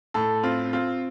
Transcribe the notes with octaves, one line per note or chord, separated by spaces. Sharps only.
A2 A4
C4 F4
C4 F4